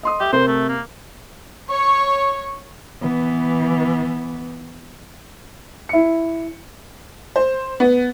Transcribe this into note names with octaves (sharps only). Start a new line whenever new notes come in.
D#5 C6 D#6
G4 E5
C3 A#4 C5
A3
A#3
C#5 C#6
E3 B3
E4 C#7
C5
B3